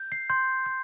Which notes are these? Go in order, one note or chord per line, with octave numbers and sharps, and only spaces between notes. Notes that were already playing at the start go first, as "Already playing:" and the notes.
Already playing: G6
C7
C6 G6
G6